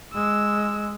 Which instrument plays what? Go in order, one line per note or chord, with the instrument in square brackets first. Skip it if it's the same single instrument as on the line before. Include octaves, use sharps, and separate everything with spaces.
[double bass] G#3 [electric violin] E6